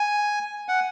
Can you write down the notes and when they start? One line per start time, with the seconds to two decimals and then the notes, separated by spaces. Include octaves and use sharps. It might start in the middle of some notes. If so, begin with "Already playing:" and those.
Already playing: G#5
0.69 F#5